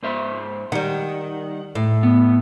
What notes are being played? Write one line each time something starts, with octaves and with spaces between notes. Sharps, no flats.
G#2 C5 E5
D#3 G3 F#5
A2
B3